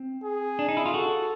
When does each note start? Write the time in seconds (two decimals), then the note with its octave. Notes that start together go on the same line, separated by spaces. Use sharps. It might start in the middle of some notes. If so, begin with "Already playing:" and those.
Already playing: C4
0.24 G#4
0.59 D4
0.69 D#4
0.77 E4
0.86 F4
0.94 F#4 A4